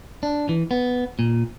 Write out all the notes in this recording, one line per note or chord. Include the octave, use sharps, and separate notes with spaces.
D4
E3
B3
A#2